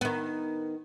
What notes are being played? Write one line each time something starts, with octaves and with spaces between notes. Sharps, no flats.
D#3 B3